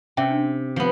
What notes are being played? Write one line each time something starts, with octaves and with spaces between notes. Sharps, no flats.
C3 C#4 E5 G5
D4
F3 B3